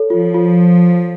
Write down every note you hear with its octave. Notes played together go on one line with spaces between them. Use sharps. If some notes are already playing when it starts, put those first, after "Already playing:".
Already playing: A4 C#5
F3 F4
F4